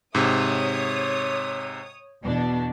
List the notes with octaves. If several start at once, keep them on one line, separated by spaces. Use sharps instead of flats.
G#2 C3 C#5 D#6
E2 B2 D4